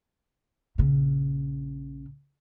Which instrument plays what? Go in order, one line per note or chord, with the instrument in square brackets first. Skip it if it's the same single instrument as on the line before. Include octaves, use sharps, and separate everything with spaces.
[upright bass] A#1 C#3